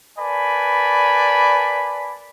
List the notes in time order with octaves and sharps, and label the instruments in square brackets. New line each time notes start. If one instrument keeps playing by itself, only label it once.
[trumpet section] A#4 B4 D5 G#5 A5 B5